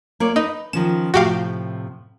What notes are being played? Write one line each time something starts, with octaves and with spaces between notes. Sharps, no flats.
A#3 C#5 D5
D#4 B4
D#3 F3 C#4 E7
A2 C3 F3 F#4 G4 F5